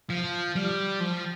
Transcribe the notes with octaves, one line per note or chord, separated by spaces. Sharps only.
F3
G3
F3